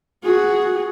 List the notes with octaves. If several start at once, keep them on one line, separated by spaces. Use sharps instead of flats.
F#4 G#4